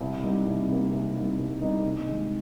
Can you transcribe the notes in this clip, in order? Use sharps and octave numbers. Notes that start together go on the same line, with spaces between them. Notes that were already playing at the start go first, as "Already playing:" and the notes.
C2
C3 G3 A#3 D#4
C2
C3 G3 A#3 D#4
C2
C3 G3 A#3 D#4
C2
C3 G3 A#3 D#4
C3
D#3 G#3